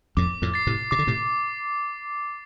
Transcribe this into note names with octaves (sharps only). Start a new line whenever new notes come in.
F2 A2 D6
F2 A2
A6 C7
A2 C3
C3 D6
D3
A2 C3